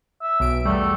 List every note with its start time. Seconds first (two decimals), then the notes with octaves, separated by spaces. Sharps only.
0.22 E5
0.40 B1 D7
0.65 E2 G3 A3